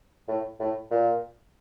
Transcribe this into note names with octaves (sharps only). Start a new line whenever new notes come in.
A2
A2
A#2